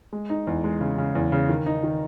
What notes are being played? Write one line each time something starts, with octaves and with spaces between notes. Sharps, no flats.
G#3
D#4
E2
G#3
C#3
C#3
E2
C#3
D#3
D#4
D#3